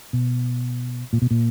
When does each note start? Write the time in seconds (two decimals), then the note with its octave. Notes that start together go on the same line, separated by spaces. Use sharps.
0.13 B2
1.13 A#2
1.22 B2
1.31 A#2